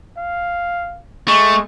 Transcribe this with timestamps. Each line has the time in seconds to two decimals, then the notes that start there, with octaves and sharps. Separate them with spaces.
0.17 F5
1.28 G#3 A3 C#6